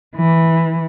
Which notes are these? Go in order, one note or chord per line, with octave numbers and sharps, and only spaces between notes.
E3